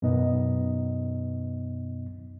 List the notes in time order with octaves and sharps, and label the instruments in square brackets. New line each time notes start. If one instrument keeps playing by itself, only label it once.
[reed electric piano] F#2 B2 B3 D#4 D#5